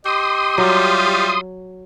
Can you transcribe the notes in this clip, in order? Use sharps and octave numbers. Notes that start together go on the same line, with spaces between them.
G4 D#5 C6 D#6
F#3 G3 F4 E5